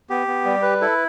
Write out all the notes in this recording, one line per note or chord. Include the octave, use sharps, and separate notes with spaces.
B3 G4
B3
G3
B4
E4 A4